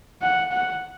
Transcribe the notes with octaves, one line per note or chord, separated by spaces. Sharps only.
F#5
F#5